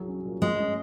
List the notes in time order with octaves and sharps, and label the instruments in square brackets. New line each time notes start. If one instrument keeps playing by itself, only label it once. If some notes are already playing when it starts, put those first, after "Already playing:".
Already playing: [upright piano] C2 F#3 G#4
C#4
A#2
[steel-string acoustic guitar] G#3 [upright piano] C#4
[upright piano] C#4